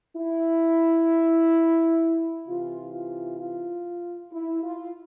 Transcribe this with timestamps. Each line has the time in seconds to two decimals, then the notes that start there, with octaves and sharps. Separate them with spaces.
0.16 E4
2.47 C3 E3 F4
2.93 F4
3.39 F4
4.32 E4
4.63 F4